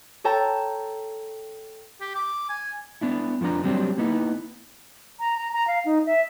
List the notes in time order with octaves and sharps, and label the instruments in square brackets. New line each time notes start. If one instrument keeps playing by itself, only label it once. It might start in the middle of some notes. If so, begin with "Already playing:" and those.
[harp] A4 C#5 G5 A5 A#5
[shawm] G4
D6
G#5
[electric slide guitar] B3 D4 E4
F2 F3 B3 D4 A#5
F#3 G3 C4 D4 G4 C5
A#3 B3 D#4 E4
[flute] A#5
A#5
A#5
F5
D#4
E5